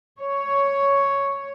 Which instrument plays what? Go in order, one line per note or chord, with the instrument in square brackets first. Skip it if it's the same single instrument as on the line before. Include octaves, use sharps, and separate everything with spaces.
[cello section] C#5